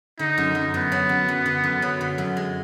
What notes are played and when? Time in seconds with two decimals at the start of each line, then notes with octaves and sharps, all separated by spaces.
0.19 D3 D#4
0.38 F#2
0.55 F#2
0.74 F#2 B3
0.92 F#3
1.09 F#2
1.28 F#2
1.46 D3
1.64 F#2
1.82 F#3
2.01 D3
2.18 F#2
2.37 G#3